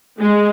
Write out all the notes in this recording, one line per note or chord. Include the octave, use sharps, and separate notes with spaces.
G#3